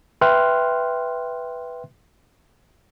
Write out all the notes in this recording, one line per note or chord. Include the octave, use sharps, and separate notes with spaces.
B4 E5 G5 C6 F6 F#6